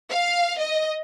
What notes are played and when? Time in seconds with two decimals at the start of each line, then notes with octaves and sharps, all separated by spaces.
0.10 F5
0.58 D#5